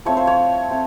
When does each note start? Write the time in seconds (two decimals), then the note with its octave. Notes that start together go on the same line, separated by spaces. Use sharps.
0.05 F3 A3 C4 C#5
0.17 C5
0.27 C#5
0.70 A3 C4